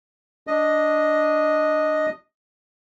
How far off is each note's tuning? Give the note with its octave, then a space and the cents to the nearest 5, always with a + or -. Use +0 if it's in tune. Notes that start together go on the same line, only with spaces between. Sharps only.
D4 +0 D#5 +0